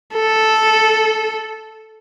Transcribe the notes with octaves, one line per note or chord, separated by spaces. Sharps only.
A4